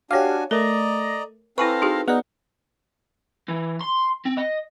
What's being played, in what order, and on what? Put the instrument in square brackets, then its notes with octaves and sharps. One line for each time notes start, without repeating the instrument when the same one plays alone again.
[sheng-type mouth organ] D4 F#4 G#5 [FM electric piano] G4 F5 [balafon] C#5 D6
[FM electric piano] A3 [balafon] A#4 [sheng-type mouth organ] D5 D#5 A#5
[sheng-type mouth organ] C4 A4 F5 [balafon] E4 G#5 C#6 [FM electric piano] B4 A#6
[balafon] D#4 F#4 G#4
[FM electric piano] B3 F#5 [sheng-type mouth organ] D#4 [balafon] G#4 D5
[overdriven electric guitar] E3
C6
C4
D#5